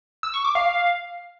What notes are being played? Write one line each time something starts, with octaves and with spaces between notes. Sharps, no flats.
E6
C#6
D6
F5